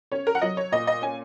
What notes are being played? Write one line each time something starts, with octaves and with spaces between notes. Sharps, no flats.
C#4 C#5
A#4
F#5
F#3 D#5
C#5
A#2 D#5
D#5
C#4 G#5